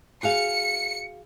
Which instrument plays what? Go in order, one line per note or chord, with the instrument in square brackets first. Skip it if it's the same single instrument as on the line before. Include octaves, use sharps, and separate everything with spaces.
[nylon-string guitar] F#4 G#4 F5 [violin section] C#7